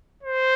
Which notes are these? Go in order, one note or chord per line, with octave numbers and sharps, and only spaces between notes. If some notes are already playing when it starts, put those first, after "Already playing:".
C5